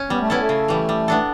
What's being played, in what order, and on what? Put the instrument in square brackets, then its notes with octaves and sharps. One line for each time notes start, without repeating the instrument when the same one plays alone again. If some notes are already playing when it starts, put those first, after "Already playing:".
Already playing: [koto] C#4
[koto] G3 [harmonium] B3
[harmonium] A3
[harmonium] B3 [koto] C#4 E4 A4
[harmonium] A3
[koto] C#3
E3 G3
G3
B3 D4 A4